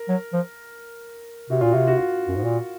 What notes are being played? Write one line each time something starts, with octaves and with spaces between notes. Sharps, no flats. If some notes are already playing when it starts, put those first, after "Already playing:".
Already playing: A#4
F#3
F3
C3 F#4
A#2 F4
C3 F#4
F#4
F4
F#2
G#2
A#2